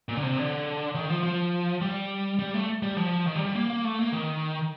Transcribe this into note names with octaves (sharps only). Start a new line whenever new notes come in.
A#2
D3
C3
D3
D#3
F3
F3
G3
G3
A3
G3
F3
D#3
G3
G3
A#3
A#3
A3
A#3
D#3